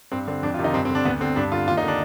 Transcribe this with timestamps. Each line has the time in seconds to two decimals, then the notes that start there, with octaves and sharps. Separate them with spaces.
0.12 G2 C4
0.28 D3 C4
0.43 F2 D4
0.54 F4
0.59 C3 D#3
0.64 D#4
0.74 G2 C4
0.85 C4
0.90 D3 D4
1.05 D2 B3
1.20 D3 C4
1.36 G2 D4
1.52 D3 F4
1.67 D#2 F4
1.77 D#4
1.83 D3 D4